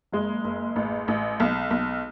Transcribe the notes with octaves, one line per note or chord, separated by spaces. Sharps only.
F#1 G#3
F#1
A1
A1
B1
B1